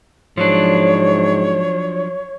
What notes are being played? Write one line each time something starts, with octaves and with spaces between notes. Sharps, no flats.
G#2 F3 F#3 D4 C#5